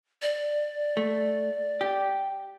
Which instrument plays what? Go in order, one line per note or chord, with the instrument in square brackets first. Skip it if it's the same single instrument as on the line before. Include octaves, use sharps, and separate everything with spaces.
[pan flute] D5
[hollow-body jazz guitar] A3
G4